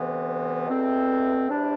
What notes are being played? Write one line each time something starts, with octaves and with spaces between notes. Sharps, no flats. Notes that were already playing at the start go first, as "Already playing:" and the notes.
Already playing: D2 C3 E3 B3
E2 B2 A3 C4
E2 C3 G3 D4